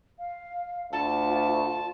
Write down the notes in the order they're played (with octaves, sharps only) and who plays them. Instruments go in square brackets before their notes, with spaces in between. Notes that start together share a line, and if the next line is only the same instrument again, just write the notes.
[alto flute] F5
[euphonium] D2 [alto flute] F4 [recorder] A5